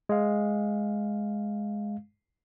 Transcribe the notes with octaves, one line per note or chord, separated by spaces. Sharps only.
G#3 F5